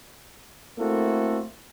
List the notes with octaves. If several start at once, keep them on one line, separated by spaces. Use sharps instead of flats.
A3 A#3 C4 E4 F#4 A4